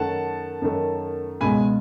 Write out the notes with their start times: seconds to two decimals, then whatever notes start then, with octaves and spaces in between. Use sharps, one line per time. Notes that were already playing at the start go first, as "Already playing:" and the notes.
Already playing: F#2 D#3 A3 F#5 A5
0.62 F#2 D#3 A3
1.41 C#2 B2 G#3 G#5 B5